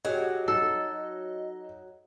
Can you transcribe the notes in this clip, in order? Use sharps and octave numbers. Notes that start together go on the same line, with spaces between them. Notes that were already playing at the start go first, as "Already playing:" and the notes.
F#3 G4 G#4 D#5
D#4 A4